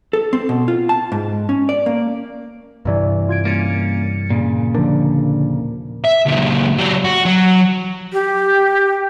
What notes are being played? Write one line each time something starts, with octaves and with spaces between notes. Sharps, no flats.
A4
C4
B2
F4
A5
G#2
C#4
D5
A#3
C2 G2 C3 E3 D5
F4 G#6 D7
G3 A#3 C#4 A6 C#7
A#2 C#3
D#2 D3 F3 A#4
E5
C#2 A#2
F#3 G4
F#4
F#3
G4